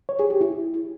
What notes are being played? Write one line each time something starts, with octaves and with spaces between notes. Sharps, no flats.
C#5
G#4
G4
E4